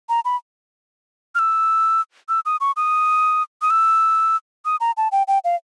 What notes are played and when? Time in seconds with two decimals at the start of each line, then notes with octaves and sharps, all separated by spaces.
0.09 A#5
0.25 B5
1.35 F6
1.39 E6
2.29 E6
2.46 D#6
2.61 C#6
2.77 D#6
3.62 D#6
3.70 E6
4.65 D#6
4.80 A#5
4.97 A5
5.12 G5
5.28 G5
5.44 F5